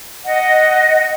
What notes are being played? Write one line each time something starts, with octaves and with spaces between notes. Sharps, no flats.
D#5 F#5